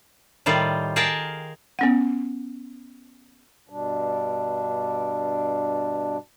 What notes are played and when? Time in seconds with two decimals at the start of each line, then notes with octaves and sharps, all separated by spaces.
0.46 A2 D#3 G3 F4
0.96 G#4 A#4 F5 G5 A5
1.79 B3 C#4 F#5
3.70 G2 B2 G3 D4